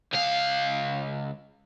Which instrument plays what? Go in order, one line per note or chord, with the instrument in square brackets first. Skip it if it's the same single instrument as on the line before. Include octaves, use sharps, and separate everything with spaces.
[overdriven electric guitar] C#2 F5